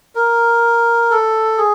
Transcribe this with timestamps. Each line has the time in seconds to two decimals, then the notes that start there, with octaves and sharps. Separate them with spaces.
0.15 A#4
1.11 A4
1.58 G#4